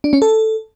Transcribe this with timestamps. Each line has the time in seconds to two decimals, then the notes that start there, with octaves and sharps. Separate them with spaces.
0.04 D4
0.13 C#4
0.22 A4